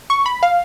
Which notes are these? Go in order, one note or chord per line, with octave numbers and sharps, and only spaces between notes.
C#6
B5
F5